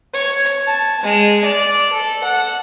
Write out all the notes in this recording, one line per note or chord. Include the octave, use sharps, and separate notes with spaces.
C#5
A5
G#3
D5
A4
F#5